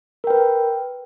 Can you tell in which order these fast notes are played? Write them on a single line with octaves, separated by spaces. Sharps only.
A#4 G5 B4